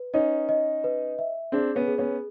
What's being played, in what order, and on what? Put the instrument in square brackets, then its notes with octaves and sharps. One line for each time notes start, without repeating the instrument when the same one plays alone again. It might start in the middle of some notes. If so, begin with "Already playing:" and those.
Already playing: [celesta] B4
[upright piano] C#4 D#4 [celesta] D#5
[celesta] D#5
B4
E5
[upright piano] C4 D4 [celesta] G#4
[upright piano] B3 C#4
[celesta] G#4
[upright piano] B3 C#4